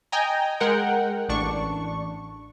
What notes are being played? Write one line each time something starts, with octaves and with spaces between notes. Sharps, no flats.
D#5 G5 G#5 A#5
G#3 A#4 F#5 G5
A1 D4 C#6